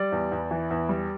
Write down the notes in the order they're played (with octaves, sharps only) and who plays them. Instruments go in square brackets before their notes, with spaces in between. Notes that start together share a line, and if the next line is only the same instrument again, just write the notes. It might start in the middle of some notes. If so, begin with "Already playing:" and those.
Already playing: [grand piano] G3 D5
E2
E2
E3
E2
G3